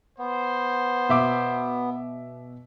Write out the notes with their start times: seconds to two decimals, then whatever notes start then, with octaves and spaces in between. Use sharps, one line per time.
0.18 B3 C5
1.09 B2 E5 D6